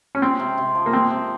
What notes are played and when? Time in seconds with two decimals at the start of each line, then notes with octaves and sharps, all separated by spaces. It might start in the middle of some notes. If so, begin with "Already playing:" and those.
0.15 C#4
0.22 G#3 C4
0.40 C3
0.58 C3
0.75 F3
0.86 A#3
0.93 G#3 C4
1.10 C3